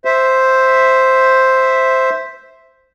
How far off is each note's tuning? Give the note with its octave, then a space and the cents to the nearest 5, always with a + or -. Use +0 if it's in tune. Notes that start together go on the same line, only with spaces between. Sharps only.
C5 +0 E5 +0